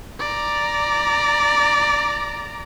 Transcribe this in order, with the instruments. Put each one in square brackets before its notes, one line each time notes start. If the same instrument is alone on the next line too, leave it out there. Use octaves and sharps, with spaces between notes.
[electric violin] D5 A#5